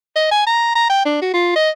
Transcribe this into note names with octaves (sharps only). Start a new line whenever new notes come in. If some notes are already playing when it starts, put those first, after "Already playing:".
D#5
G#5
A#5
A#5
G5
D4
F#4
F4
D#5